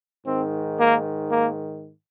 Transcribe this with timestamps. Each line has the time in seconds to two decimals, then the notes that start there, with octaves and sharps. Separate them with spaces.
0.25 G#2 D#3 C4
0.78 A#3
1.30 A#3